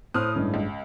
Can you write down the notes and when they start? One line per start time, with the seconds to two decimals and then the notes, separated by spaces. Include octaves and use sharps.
0.14 A2 C5 D#6 F6 F#6
0.35 G#1 G2 C#3 G#3
0.54 C#2